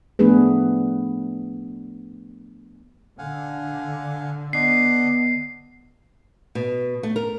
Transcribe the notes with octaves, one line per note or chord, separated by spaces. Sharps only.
F3 A3 B3 D4 G#4 B4
D3 F5 F#5 G#5
B3 D4 D#5 F#5 C7
B2
A3
A#4